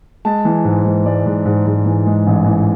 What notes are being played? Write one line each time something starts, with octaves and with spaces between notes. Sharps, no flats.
G#3 A5
E3
G#2
G#2
G#3 D5
G#2
G#2
G#2
E3
G#3
A1
E3